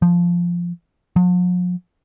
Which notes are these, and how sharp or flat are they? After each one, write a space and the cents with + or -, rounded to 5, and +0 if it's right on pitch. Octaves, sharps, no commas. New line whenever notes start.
F3 -5
F3 +45